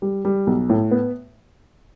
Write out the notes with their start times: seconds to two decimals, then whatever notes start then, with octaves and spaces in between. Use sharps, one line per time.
0.02 G3
0.25 G3
0.47 B1
0.70 A2
0.91 B3